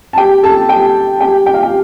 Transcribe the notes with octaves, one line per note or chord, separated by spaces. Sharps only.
A5
G4 G5
A4 A5
G4 G5
G4 G5
G5
F5
G4 G5